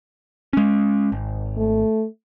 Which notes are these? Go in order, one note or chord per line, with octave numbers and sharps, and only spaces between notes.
G#3 C#4
G#1
A3